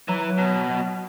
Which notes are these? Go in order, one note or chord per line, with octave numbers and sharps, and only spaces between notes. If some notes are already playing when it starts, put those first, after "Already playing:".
E3 F#3
F#3
B2